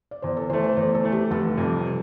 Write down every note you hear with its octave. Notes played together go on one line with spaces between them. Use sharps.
D5
E2 C5
A4
E3 A3 C5
C5
E2 C5
A4
E3 A3
G4
F1 A4
F2 C3 G3